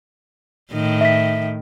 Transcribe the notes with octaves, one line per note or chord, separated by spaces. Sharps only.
A2 D#3
E5 B6